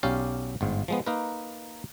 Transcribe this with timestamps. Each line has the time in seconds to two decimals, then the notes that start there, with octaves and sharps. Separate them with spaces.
0.03 B1 C#4 G4 D5 F5
0.61 G1 G#2 F4
0.88 F3 G#3 B3
1.06 A#3 D#4 A#4 B4